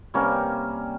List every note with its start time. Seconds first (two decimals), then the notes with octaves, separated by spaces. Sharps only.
0.14 C3 G3 A#3 C#4